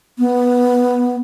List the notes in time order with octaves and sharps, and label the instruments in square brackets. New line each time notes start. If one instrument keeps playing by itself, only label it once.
[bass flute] B3